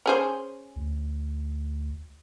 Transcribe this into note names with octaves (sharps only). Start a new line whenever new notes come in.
C#4 G#4 C5
D2